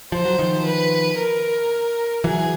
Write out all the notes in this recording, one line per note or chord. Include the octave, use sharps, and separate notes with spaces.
F3 C5
F#3
D#3 F3
B4
A#4
E3 F#3 G#4